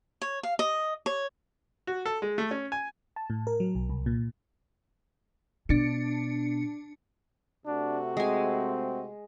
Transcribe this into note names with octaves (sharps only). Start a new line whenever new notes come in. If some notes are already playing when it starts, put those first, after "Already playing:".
C#5
F5
D#5
C#5
F#4
A4
G#3
A3
C#4
G#5
A5
A2
A#4
F#3
B1
C2
A#2
B2 D4 C#7
C3 A3 D4 F#4
G#3 C4 G#5